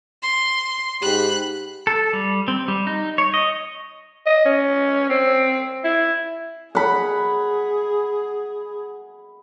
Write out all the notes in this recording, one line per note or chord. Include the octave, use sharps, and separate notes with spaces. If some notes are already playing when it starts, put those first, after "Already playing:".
C6
G#2 G4 B5 F#6
A4
G3
C4
G3
D#4
C#5
D#5
D#5
C#4
C4
E4
G#4 F#5 B5